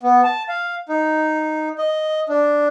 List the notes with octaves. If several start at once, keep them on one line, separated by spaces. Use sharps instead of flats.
B3
A5
F5
D#4
D#5
D4